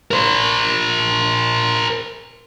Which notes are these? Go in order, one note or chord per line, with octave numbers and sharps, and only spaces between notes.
A#4 C5